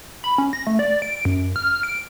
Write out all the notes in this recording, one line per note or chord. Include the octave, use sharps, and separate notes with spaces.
B5
C#4
A#6
A3
D5
D7
F#2
F6
D7